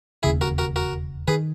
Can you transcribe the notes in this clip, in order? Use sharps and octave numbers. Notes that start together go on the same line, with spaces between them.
E1 D#2 C#3 E4 G#4
F#4 A#4
F#4 A#4
F#4 A#4
D#3 G#4 B4